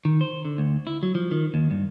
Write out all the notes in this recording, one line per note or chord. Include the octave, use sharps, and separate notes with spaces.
D#3
C5
D3
D2
E4
F#3
F3
D#3
D#2
G2